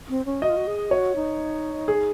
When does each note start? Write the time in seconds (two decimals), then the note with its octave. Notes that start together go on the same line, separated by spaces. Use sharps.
0.10 C4
0.26 C#4
0.42 F#4 D#5
0.50 F4
0.57 F#4
0.67 G#4
0.90 F#4 C#5
1.16 D#4
1.88 G#4